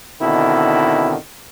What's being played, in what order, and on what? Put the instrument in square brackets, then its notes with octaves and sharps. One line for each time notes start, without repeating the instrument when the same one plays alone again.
[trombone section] B2 D3 D#3 C4 E4